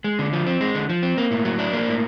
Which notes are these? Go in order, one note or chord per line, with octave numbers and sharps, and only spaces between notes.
G#3
D3
F3
C4
G#3
D3
F3
C4
A#3
A2
F#3
D4
A#3
A2